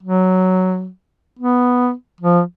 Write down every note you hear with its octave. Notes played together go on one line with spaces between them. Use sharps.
F#3
B3
F3